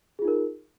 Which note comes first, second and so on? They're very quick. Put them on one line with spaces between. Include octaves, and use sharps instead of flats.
G#4 F4 D#4 A#4